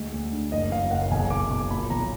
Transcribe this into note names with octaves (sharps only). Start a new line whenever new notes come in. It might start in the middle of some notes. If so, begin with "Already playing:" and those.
Already playing: D2 G#3
D2
D3
F#1 D#5
F#2 F5
F#1 F#5
B1 G#5
B2 D6
B1 D6
A#2 B5
B1 A#5